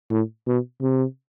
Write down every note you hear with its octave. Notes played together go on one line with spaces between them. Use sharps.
A2
B2
C3